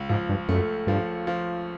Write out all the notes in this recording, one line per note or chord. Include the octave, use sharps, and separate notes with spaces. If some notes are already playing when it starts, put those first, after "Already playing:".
Already playing: C#2
G#2 F3
G2
F#2 A3
G2 F3
F3